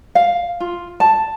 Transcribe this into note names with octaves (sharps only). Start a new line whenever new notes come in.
F5
F4
A5